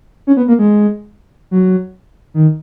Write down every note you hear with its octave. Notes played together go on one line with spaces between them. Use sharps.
C#4
B3
A#3
G#3
F#3
D#3